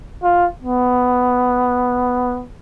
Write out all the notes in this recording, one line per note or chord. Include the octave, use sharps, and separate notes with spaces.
F4
B3